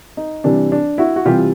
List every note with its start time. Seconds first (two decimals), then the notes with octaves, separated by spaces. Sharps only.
0.17 D#4
0.44 C3 E3 G3 D4
0.72 D4
0.98 E4 F#4
1.16 F#4
1.26 C3 E3 G3 F4 G4